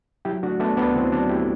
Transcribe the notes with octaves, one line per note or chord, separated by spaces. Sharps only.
F#3 E4 G4
A3 D4 F#4
A3 B3 D4
D2 B3 D4
D3 C4 E4
F#3 D4 F#4
A3 E4 G4